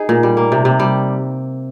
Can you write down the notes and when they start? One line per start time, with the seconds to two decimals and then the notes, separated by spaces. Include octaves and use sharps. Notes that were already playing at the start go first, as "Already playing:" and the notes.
Already playing: D#4 G#4
0.09 A#2
0.23 G3
0.37 A#3
0.52 C3
0.65 C3
0.79 G3